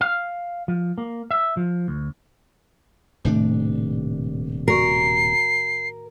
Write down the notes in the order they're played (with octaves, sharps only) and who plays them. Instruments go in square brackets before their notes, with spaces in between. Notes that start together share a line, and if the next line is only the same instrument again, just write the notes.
[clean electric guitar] F5
F3
A#3
E5
F3
D2
[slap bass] D#1 C3 D4 [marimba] A2 D#3 A3
[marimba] F#4 D5 C#6 [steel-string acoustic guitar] A#4 [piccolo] C7